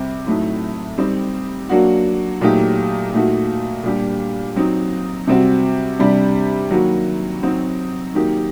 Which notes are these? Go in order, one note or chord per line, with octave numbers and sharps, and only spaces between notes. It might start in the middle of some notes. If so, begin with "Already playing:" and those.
Already playing: C3 G3 C4
A2 F#3 A3 D#4
G3 C4 D#4
F#3 A#3 D4 F#4
A#2 F#3 A3 D#4 G4
A#2 A3 D#4 F#4
A#2 G3 D4 G4
F#3 C4 D#4
C3 G3 C4 F#4
C3 G3 D4 G4
D#3 F#3 A#3 F#4
F#3 C4 D#4 F#4
D#3 F#3 A#3 D#4 G4